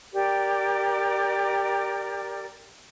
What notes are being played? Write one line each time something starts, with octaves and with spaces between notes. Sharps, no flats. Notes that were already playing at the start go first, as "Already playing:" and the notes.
G4 A#4 D5